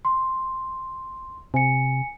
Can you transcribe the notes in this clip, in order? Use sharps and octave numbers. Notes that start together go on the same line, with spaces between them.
C6
C3 G#5 C#7